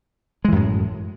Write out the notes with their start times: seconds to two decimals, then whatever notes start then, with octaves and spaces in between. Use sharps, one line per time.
0.45 G#3
0.48 E3
0.52 F#2
0.56 A2